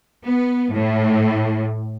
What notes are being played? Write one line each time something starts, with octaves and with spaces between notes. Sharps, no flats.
B3
A2